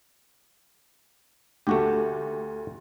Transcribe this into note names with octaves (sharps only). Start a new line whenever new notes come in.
D2 A3 F#4 G4